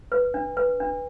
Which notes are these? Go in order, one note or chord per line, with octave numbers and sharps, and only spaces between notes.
B4
D4
B4
D4